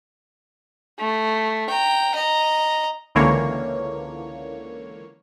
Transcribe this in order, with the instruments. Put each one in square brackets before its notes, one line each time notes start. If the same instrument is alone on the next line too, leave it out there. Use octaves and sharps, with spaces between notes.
[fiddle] A3
G5 A#5
D#5 A#5
[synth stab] C#2 D3 E3 A#3 C#5